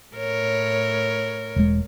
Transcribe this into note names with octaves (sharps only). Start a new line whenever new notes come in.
A2 A#4 C#5
E1 G#3